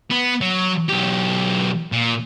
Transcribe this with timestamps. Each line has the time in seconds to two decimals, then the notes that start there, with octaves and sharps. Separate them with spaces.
0.10 B3
0.41 F#3
0.89 B1 G4
1.92 A#2